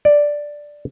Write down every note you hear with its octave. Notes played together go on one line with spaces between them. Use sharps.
D5